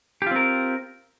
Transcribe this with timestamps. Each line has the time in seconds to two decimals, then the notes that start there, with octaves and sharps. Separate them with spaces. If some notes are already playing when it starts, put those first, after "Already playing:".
0.22 G4
0.27 F4
0.31 C4
0.36 A#4